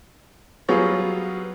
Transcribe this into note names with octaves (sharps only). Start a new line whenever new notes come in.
F#3 G3 B3 F4 G#4 C#5